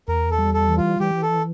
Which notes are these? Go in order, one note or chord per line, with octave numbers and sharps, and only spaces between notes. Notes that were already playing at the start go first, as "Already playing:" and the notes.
E2 A#4
A4
G3
A4
E3
F4
E3 G4
A4